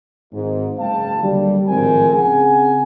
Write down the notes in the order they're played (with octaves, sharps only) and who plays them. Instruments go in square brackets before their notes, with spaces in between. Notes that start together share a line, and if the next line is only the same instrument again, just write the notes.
[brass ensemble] G#1 G#2
F#1 G#3 F5 G5 A5
D#2 D3 F#3 G3
G#1 A2 F3 C4 A#4 G#5
C#3 C4 G#4 F#5 G#5